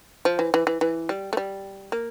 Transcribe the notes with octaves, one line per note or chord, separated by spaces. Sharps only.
F3
E3
E3
E3
E3
G3
A3
G3
A#3